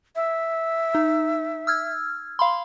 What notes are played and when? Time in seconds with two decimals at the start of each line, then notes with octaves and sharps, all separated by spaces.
0.16 E5
0.95 D#4
1.67 E6 F6 G#6
2.39 F5 B5 C6